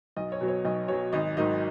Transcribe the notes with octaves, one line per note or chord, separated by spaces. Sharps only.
B1 D#5
C#5
B2 F#3
C#5
B1 D#5
B2 F#3 C#5
G#1 D#5
G#2 D#3 F#3 D#5